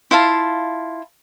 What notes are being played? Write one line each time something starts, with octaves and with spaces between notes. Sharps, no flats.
E4 F4 F5 A5